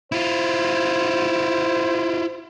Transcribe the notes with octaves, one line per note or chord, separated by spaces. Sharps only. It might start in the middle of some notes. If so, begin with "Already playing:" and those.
E4 F4 C5